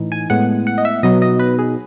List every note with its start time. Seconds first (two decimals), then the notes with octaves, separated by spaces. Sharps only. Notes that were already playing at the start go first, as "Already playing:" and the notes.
Already playing: A2 E3 D#4
0.12 G#5
0.30 A2 G#3 B3 F#5
0.67 F#5
0.78 D#5
0.85 E5
1.03 B2 F#3 B3 D#4 D#5
1.22 D#5
1.39 B4
1.59 G#4